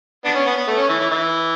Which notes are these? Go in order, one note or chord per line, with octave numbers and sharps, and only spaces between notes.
B3 D4
C#4
B3
B3
A3
C#4
E3
E3
E3